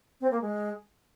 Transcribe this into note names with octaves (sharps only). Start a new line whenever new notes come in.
C4
A#3
G#3